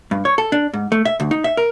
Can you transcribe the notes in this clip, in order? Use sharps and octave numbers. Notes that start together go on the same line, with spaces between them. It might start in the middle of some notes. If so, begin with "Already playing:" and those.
G2
C#5
A4
D4
G#2
A3
E5
D2
D#4
E5
A#4